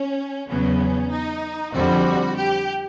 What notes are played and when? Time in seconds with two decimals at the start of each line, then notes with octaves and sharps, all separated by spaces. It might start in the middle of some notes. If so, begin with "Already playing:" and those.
Already playing: C#4
0.50 E2 C#3 F#3 B3 C#4
1.12 D#4
1.74 F2 D3 G3 C4 F#4
2.36 G4